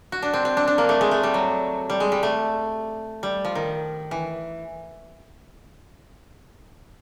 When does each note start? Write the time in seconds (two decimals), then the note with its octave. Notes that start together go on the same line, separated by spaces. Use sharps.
0.12 F#4
0.22 D4
0.33 C4
0.45 C4
0.57 D4
0.67 D4
0.78 A#3
0.89 A3
1.01 G#3
1.11 A3
1.23 G3
1.34 F#3
1.90 G3
2.00 G#3
2.12 G3
2.23 A3
3.23 G3
3.45 F3
3.55 D#3
4.11 E3